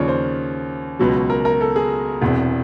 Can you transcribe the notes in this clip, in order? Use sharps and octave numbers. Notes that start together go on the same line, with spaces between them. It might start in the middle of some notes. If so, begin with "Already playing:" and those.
Already playing: D#2 C#3 F3 C#5 D5
C5
C#2 B2 F#3
A#4
A#4
A4
G#4
E1 E2 C3